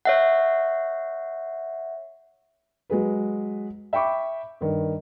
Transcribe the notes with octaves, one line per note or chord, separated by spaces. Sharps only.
C#5 E5 F#5
F#3 G#3 G#4 B4
E5 G5 B5 C#6 D6
G2 D#3